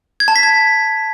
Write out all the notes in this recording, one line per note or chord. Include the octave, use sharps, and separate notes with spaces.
G#6
A5
B6
G#6